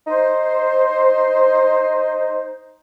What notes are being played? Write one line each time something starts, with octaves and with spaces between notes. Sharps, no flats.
D#4 C5